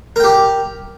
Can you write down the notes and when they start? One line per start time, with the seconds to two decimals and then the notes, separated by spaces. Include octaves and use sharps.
0.16 A#4
0.20 G5
0.24 G4